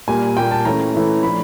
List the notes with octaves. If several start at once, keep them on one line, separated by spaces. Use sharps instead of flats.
A#2 G3 A#3 G#5
A#2 G3 A#3 G5
A5
E3 A3 C#4 A#5
E3 A3 C#4
F3 A3 D4 B5